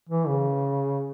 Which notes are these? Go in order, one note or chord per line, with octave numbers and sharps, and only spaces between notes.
E3
C#3